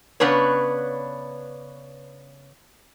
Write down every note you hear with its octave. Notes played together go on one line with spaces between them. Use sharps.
C#3 B3 D4 B4 C#5